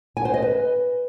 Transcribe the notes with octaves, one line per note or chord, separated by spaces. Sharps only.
G#5
C5
D#5
B4